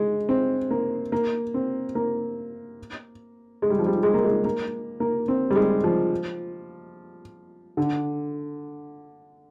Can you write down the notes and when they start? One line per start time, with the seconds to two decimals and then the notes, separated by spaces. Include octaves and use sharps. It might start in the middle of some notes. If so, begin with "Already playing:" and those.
Already playing: G#3
0.29 C4
0.71 A#3
1.12 A#3
1.54 C4
1.95 A#3
3.62 G#3
3.70 G3
3.79 F3
3.86 G3
4.03 G#3
4.14 A#3
4.24 G#3
4.45 A#3
5.00 A#3
5.28 C4
5.51 G3
5.55 G#3
5.84 F3
7.77 D3